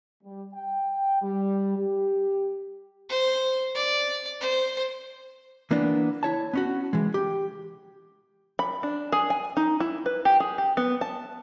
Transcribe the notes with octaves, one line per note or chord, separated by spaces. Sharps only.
G3
G5
G3
G4
C5
D5
C5
E3 A#3 B3 D4
E4 C#5 A5
B3 C#4 F#4
E3 G#3
G4
B5
D4
G#4
G#5
D#4
E4
B4
G4
G#4
G4
B3
A5